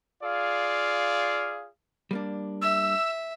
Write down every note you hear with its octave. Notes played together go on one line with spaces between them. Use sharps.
F4 G#4 D5 F5
G3 A#3 D4
E5 E6